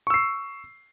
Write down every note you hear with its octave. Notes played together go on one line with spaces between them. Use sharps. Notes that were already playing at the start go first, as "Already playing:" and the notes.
C#6 E6 C7